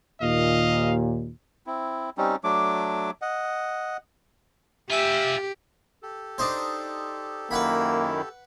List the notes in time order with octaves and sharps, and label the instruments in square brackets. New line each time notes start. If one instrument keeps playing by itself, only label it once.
[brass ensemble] D#2 A#2 [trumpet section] D#5 F5
[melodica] C4 E4
G3 C4 C#4 D#4
F#3 A3 D4 D6
D#5 F#5
[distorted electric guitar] F4 G#5 [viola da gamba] G4 [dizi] E5
[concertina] G4 A4
[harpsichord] D4 D#4 C5
[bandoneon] F#2 D#3 E4 [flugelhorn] A#3 [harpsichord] B4 F#5 B5